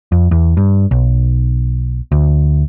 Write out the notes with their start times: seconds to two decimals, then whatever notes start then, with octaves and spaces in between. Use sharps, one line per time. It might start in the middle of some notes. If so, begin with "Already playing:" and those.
0.12 F2
0.31 E2
0.57 G2
0.91 B1
2.12 D2